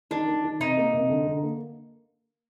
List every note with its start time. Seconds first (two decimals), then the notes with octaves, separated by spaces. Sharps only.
0.11 D#3 D4
0.28 D#3
0.44 D#3
0.60 C3 D#4
0.77 A#3
0.94 C3
1.09 D3
1.27 D3
1.43 A#3